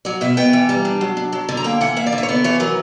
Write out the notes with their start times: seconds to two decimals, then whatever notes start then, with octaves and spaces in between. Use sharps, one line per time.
0.05 F#3 D5
0.21 B2 E5
0.37 B3 G5
0.53 E3
0.69 G3 A#5
0.85 D4
1.01 F#3
1.17 D4
1.32 F#3
1.49 D3
1.57 A#5
1.64 A#3 G5
1.81 E3 F#5
1.96 A#3 E5
2.06 D5
2.12 D3
2.18 E5
2.23 C#5
2.28 B3 D5
2.44 E3 C#5
2.60 F#3 A#4